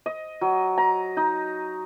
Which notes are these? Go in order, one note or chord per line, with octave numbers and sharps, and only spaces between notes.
D#5
F#3
A#5
D#4